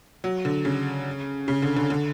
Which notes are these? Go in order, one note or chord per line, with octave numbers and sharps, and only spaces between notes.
F#3
D3
C#3
C#3
D3
D3
D3